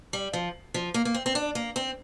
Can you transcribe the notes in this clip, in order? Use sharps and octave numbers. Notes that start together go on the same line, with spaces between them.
G3
F3
F3
A#3
A#3
C4
C4
D4
A#3
C4